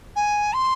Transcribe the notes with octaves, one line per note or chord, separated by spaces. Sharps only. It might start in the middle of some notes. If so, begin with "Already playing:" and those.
G#5
C6